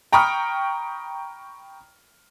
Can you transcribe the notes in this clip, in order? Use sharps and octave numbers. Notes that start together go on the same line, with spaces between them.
G5 A#5 B5 C#6 D#6 F6